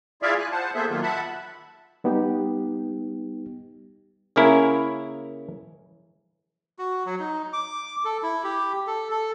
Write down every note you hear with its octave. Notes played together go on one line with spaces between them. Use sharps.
E4 F4 G#4 D5 E5 F5
G#5 F#6
C5 F#5 A5
A#3 B3 G#4 A4 C5 E5
A#2 D#3 F#3 A#3 F4
E5 F#5 A5 B5
G3 B3 D#4 G4
C#3 A#3 C#4 E4 A#4
F#4
F#3
D#4
D6
A4
E4
G4
A4
A4